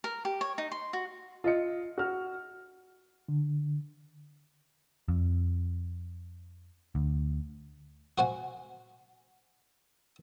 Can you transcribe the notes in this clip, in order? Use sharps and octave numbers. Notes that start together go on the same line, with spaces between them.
A#4
G4
C#5
D#4
C6
F#4
F4 D#5 C#7
F#4 F6
D3
F2
D2
F#4 C5 F#5 G#5